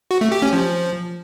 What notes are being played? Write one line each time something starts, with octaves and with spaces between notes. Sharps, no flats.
F#4
A3
G4
C#4
F3